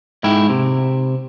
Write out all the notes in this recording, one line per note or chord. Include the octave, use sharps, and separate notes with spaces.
G#2 E4 G5
C3